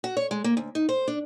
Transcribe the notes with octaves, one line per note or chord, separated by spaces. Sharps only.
F#4
C#5
G#3
A#3
D2
D#4
C5
D4